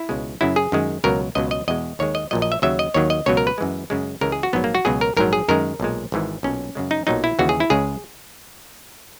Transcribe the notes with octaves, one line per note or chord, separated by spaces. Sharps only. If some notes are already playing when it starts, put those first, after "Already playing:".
Already playing: E4
C#2 B2 G#3
F#2 C#3 F#3 E4
G#4
F#2 D#3 G#3
C#2 B2 F#3 A#4
C#2 B2 F#3 D#5
D#5
E2 B2 G#3 D#5
D#2 D#3 G#3 C#5
D#5
A#1 A#2 F#3 D#5
D#5
E5
D#2 C#3 F#3 E5
D#5
D#2 D#3 F#3 C#5
D#5
C#2 B2 F#3 C#5
A#4
B4
F#2 E3 G#3
F#2 C#3 G#3
C#2 C#3 E3 G#3 A#4
G#4
F#4
A#1 G#2 F#3 B3
A#3
F#4
C#2 B2 F#3 G#4
A#4
A#1 G#2 F#3 A#4
G#4
F#2 D#3 G#3 A#4
B1 A#2 G#3
G#1 G#2 E3 G#3
B1 A#2 F#3 C#4
F#2 C#3 G#3
D#4
B1 A#2 F#3 D#4
E4
D#2 C#3 E3 F#4
G#4
E4
C#2 C#3 G#3 G#4